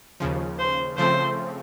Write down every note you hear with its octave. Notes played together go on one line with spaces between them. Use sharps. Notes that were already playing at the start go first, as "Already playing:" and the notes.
D#2 C#3 F3
C5
C#3 F3 A3 C4 C5